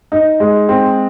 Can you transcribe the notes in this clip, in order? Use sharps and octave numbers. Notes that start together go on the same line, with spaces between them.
D#4
G#3
C4